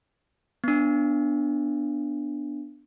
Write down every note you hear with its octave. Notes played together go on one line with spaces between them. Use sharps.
B3 D4